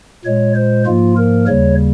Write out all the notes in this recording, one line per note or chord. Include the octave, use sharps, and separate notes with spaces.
A#2 G#3 C#5
C5
G#2 F3 A#3 F4
A#4
D#2 C#3 G3 C#5